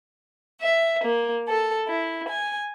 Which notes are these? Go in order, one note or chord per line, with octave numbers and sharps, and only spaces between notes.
E5
A#3
A4
E4
G#5